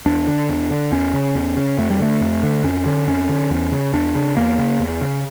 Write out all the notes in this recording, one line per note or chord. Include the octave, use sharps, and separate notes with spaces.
E2 D4
D3
E2
D3
E2 C#4
C#3
E2
C#3
F2 A3
G3
D3 A3
F2
D3
F2 C#4
D3
F2 C#4
D3
E2
C#3
E2 D4
C#3
E2 A#3
C#3
E2
C#3